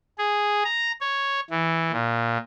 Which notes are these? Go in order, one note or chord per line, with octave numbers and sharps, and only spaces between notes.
G#4
A#5
C#5
E3
A#2